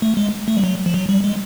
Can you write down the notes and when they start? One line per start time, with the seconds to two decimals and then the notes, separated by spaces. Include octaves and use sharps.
0.02 A3
0.17 G#3
0.48 A3
0.57 G3
0.64 F#3
0.86 F3
0.94 F#3
1.09 G3
1.24 G#3